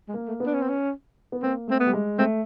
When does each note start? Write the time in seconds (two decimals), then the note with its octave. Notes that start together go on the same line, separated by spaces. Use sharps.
0.08 G#3
0.14 A#3
0.28 A3
0.40 B3
0.46 D4
0.54 C#4
0.62 C4
0.69 C#4
1.32 B3
1.42 A#3 C4
1.68 A3 C4
1.80 B3
1.86 G3
1.93 G#3
2.19 A3 C4